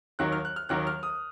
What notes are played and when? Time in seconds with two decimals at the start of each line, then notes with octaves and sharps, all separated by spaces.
0.19 D#2 D#3 F#3 F#6
0.32 F6
0.45 F#6
0.56 F6
0.69 D#2 D#3 F#3 F#6
0.87 F6
1.03 D#6